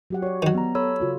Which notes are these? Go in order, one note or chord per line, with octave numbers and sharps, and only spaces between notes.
F#3 G4 F#5
F#4 C#5 D5
D#3 F#3
B3 A#5
A4 C#5 B5 E6
C#3 F4 F#4